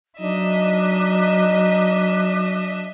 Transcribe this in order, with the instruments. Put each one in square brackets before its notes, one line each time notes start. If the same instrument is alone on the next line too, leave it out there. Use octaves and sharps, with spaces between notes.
[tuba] F#3 [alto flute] D4 [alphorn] D#4 [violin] D#5 E5